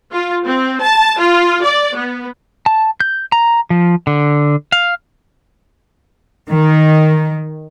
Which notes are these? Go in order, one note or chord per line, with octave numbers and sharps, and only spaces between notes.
F4
C4
A5
F4
D5
B3
A5
G6
A#5
F3
D3
F5
D#3